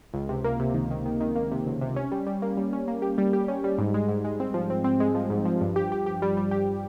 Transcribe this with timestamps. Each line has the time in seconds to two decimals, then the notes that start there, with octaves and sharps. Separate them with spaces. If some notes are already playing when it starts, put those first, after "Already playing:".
0.14 C#2
0.29 C3
0.44 A#3
0.59 C3
0.74 D#3
0.91 D#3
1.06 D#3
1.20 D#3
1.36 A#3
1.51 C3
1.67 C#2
1.81 C3
1.96 C#4
2.12 G3
2.27 G3
2.42 A#3
2.57 G3
2.73 C#4
2.88 A#3
3.02 G4
3.18 G3
3.33 G4
3.48 C#4
3.64 G3
3.78 G#2
3.94 G#3
4.09 G#2
4.24 G#3
4.40 C4
4.54 F3
4.70 C4
4.84 C4
5.00 G#3
5.15 F3
5.30 G#2
5.45 F3
5.61 G2
5.76 G4
5.92 G4
6.06 G4
6.22 G3
6.37 G3
6.51 G4